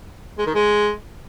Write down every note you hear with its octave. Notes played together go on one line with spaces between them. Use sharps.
G#3
D#3
G#3